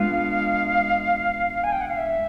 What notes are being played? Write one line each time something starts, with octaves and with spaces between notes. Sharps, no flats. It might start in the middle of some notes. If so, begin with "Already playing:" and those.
Already playing: G#3 B3 D4 F4 F5
G#5
G5
F#5
F5
E5